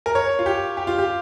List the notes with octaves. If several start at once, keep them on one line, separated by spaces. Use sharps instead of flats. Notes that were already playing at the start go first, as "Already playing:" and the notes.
A#4
C#5
F4
G4
G4
F4
G4